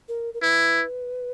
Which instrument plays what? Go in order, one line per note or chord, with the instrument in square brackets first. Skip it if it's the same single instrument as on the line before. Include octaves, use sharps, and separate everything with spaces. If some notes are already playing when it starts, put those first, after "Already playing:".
[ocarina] A#4
A#4
[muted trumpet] E4 [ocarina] B4